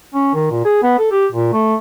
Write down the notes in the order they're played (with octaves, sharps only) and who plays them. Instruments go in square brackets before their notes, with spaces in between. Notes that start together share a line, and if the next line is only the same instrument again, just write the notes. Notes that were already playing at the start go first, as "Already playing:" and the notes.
[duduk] C#4
D#3
A#2
G#4
B3
A4
G4
A#2
A3